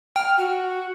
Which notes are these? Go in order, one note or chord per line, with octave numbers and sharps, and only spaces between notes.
G5 F6
F#4